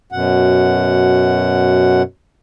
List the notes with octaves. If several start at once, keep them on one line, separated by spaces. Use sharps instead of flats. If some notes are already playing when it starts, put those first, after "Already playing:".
F#2 B2 F#5